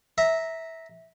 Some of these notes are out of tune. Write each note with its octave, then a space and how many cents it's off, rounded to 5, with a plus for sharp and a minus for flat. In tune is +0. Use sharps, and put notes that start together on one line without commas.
E5 -15 A#5 +0